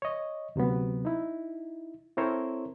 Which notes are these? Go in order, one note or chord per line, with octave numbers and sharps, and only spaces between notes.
C#5 D#5
D2 C3 F#3 B3
D#4 E4
C4 E4 A4 A#4 C5 C#5